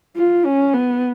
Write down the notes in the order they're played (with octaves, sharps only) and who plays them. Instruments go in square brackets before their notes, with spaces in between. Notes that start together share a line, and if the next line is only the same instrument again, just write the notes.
[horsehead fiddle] F4
C#4
B3